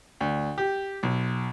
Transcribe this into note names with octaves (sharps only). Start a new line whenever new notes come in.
D2
G4
B1